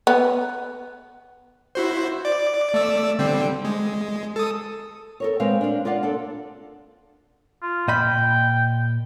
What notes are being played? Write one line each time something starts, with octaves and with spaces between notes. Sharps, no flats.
B3
E4 F#4 C5
D5
A3 D5 E6
D3 G3 C4
G#3
A4 D#6
A4 A#4 C#5
G#3 C4 A#4 B4 F5
D4 F5
F4 A#4 D5 F5 F#5
D4 A4
F4
A#2 D#5 G5 B5